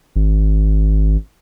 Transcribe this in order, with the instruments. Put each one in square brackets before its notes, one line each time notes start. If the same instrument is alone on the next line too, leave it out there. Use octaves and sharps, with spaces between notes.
[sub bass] G#1